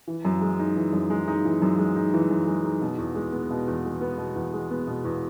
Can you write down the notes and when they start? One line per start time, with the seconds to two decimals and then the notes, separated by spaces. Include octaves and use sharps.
0.07 E3
0.25 F#2
0.42 G#3
0.59 D#4
0.76 E3
0.93 F#2
1.10 G#3
1.28 D#4
1.45 E3
1.62 F#2
1.79 G#3
1.96 D#4
2.14 E3
2.31 F#2
2.47 G#3
2.65 D#4
2.82 B2
2.98 E2
3.15 G#3
3.33 B3
3.50 B2
3.68 E2
3.85 G#3
4.01 B3
4.18 B2
4.35 E2
4.53 G#3
4.71 B3
4.87 B2
5.04 E2